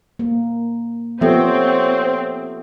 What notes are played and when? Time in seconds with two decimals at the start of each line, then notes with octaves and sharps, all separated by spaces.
0.19 A#3
1.21 F3 B3 C4 G4 A4 C#5 E5